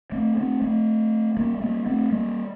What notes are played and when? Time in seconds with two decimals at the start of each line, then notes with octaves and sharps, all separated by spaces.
0.12 A3 C4
0.37 A3 C4
0.62 A3 C4
1.37 G3 A#3
1.57 A3
1.61 G3 A#3
1.86 A3 C4
2.11 G3 A#3